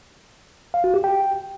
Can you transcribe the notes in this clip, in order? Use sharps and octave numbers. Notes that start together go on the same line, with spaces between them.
F5
F#4
G4
G5